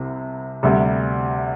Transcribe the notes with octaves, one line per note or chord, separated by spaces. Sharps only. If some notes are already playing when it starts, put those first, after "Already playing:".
Already playing: C2 C3
D2 C3 G3